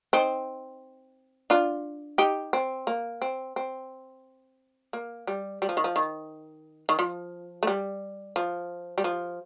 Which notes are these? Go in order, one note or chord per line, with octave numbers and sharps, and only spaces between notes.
C4 D#4
D4 F4
D#4 G4
C4
A#3
C4
C4
A#3
G3
G3
F3
D#3
F3
D#3
D#3
F3
A3
G3
F3
G3
F3